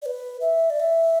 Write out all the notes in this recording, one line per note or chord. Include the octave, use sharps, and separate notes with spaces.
D5
B4
E5
D5
E5